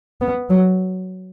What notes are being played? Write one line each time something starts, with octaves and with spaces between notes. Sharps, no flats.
B3
F#3